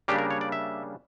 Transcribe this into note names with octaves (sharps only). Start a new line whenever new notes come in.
C#3 G3 A#3 D4 G4
A#4
C#5
D5
E5